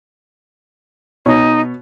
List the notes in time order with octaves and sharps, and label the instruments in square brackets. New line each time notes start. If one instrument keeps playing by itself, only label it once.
[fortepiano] B2 C#5 [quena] D#4